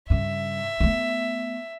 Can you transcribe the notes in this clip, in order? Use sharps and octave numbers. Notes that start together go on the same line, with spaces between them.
G2 C#3 E5
A3 B3